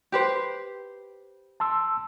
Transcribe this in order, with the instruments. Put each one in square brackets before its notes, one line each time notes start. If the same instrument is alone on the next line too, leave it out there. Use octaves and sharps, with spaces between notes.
[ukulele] G4 B4 C5
[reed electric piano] A5 C6 E6